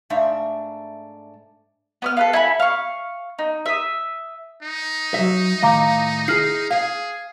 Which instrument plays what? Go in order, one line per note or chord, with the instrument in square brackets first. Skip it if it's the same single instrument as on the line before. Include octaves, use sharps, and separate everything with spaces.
[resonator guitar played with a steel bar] G#2 A3 D4 E5 F5
[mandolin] B3 D#6 F6
A4 B4 F5
E4 F#5 G#5 B5
F5 C#6
D#4
E5 D#6
[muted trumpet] D#4
[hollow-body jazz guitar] F#3 E5
[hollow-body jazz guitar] A2 D#3 [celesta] F5 A#5 D6
[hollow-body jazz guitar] E4 G#4 [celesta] F6 C7
[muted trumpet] G#4 [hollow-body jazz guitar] F5